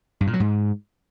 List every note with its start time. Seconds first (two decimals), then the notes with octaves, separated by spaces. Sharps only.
0.21 G2
0.27 A#2
0.33 F#3
0.40 G#2